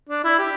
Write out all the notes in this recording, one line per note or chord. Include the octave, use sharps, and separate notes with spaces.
D4
E4
G4